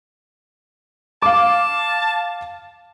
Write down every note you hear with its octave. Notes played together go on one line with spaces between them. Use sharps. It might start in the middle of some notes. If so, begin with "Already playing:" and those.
F5 A5 D6